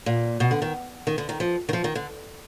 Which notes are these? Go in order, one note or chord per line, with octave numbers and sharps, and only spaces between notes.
A#2
B2
D3
D#3
D#3
D3
D#3
F3
D#3
F3
D#3
D3